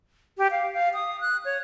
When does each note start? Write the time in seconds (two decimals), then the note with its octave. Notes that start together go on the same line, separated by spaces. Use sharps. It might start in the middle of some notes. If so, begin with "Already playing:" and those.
0.38 G4
0.51 F5
0.73 F5
0.94 D#6
1.21 F#6
1.45 C#5